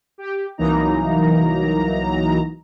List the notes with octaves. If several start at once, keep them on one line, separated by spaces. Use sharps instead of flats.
G4
C2 E3 F#3 A#3 D#4 A#5